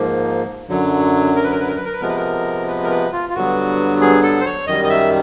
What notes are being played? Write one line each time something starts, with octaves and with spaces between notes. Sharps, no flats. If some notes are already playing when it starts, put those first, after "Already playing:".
Already playing: G#2 F3 A#3
F#2 D3 F#3
A#4
B4
A#4
B4
A#4
B4
A#4
B4
C3 F3 G#3 B3 A#4
B4
A#4
B4
A#4
B4
F4
F4
G2 D3 F#3 B3 F#4
G#4
A4
C5
C#5
F#2 D#3 G3 D#5
D#5
E5